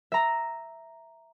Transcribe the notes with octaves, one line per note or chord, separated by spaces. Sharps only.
E5 A#5